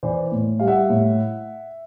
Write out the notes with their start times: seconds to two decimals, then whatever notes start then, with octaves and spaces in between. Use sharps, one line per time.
0.03 E3 C5 D5
0.32 A2
0.60 G3 F5
0.67 E5 F#5
0.89 A2